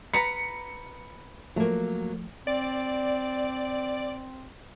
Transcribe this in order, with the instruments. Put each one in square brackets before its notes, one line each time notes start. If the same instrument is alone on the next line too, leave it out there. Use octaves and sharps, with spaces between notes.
[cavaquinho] B4 A#5 B5 [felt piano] C#7
[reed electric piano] F3 A3 [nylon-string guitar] F#3 A#3
[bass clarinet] C4 [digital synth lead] D5